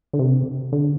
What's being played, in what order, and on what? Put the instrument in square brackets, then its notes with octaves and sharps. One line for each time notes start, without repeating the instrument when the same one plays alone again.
[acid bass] D3
C3
D3